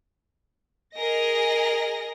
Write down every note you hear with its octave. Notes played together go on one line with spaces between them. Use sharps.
G#4 A#4 D#5 A#6